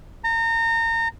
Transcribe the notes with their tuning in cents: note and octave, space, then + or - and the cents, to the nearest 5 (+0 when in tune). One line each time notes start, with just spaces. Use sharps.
A#5 -30